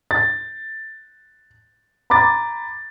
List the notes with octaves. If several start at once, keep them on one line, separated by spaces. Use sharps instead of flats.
A6
A#5 B5 D6 A6